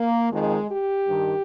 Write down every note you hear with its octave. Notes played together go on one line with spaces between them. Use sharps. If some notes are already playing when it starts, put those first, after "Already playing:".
Already playing: A#3
F2 D#3 G#3
G4
G2 D#3